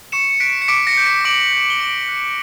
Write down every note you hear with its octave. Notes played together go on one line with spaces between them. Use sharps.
C#6 C#7 E7
C#7
F#6 B6 D7
C#7
D6 B6 D7
A#6 C#7
G6
B6 D7
D6 D7 F#7
G6
G7
C#6 D7 F#7
F#6